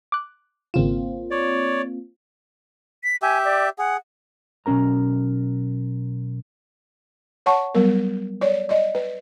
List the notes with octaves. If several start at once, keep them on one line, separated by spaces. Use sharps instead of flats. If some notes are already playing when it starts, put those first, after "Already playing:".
D6 F#6
G#1 C#3 A#3 C4 F4 E7
C#5 D5
B6
G4 E5 G#5
D5
G#4 F#5
B1 A#2 C#4 A#4 A#5
C#5 F#5 A5 C#6
F#3 G3 B3 A#4
C#5 D5
D5 D#5
B4